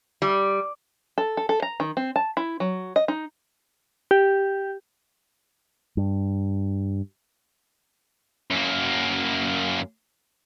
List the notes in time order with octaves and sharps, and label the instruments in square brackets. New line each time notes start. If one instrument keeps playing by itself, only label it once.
[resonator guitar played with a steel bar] G3
[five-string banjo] A4
A4
A4
A#5
D#3
C4
A5
E4
F#3
D#5
D#4
[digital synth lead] G4
[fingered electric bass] G2
[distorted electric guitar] F#2 A#3